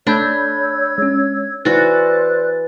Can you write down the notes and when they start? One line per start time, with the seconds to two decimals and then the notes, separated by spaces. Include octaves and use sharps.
0.07 A3 D4 C#5 B5 E6 G6 G#6
0.98 G#3 C#4
1.65 E3 F#4 C5 D5 F#6 A6